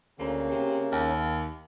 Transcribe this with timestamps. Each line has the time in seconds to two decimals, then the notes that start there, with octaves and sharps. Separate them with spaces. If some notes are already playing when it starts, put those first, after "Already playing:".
0.19 D2 C#3 A#3
0.51 C3
0.92 D#2